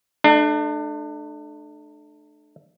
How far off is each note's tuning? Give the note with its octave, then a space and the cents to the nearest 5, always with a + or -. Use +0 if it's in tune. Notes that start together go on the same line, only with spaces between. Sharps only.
A3 -20 D4 +35